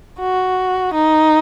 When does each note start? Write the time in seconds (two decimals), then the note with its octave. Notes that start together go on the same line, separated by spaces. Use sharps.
0.19 F#4
0.94 D#4